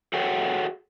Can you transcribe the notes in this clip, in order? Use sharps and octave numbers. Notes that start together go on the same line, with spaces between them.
F#4 G#4 A4 C#5 F#5 G5